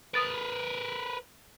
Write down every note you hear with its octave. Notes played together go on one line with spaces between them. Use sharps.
A#4 B4 D#6 A6 D7